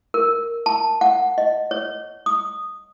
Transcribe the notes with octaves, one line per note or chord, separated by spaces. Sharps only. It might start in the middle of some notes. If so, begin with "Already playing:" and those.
A#4
A5
F#5
D#5
C#5
D#6